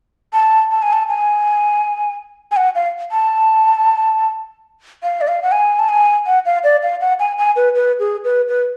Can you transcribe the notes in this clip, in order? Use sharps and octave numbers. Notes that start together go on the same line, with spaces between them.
A5
A5
G#5
A5
G#5
G#5
F#5
F5
A5
F5
D5
F5
F#5
G#5
A5
G#5
F#5
F5
D5
F5
F#5
G#5
G#5
B4
B4
G#4
B4
B4